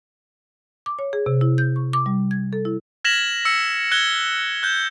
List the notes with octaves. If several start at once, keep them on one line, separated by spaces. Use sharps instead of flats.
D6
C#5
G#4
C3
E4
G6
C#6
D6
G3
G#6
A4
E4
F6 G#6 A#6 B6 E7 F#7
E6 A#6 C#7
F#6 G#6 C#7 G7
F#6 G6